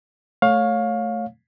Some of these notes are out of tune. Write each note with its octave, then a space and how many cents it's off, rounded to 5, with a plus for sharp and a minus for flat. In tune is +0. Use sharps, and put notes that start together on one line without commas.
A3 +0 C#5 +0 F5 +20